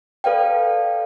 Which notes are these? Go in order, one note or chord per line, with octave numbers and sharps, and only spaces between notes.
A4 B4 D5 F5 G5